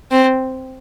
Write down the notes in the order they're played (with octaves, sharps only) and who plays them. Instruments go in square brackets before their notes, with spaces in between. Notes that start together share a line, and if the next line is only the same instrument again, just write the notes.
[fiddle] C4